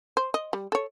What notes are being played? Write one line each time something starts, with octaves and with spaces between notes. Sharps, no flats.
C5
D#5
G3
A4 C#5